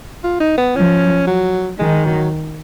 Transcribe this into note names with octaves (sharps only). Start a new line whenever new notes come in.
F4
D#4
B3
F3 C#4
F#3
D#3 G#3
F#3